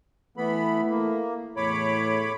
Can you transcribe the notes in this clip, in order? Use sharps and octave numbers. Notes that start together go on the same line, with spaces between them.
E3 A3 B3 E4 B5
A#3
E2 A2 C#5 B5 D6